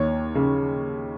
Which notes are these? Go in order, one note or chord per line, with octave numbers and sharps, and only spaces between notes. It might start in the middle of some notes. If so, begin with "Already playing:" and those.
Already playing: D#2 C#5
C#3